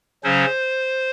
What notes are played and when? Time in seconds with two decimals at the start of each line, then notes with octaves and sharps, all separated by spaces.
0.23 C#3 F#3 C#4 C5